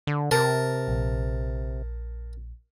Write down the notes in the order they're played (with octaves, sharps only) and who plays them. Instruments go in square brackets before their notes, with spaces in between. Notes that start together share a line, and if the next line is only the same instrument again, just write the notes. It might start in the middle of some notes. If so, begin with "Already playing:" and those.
[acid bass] D3
[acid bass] C3 [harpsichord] A#4 A5
[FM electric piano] A#1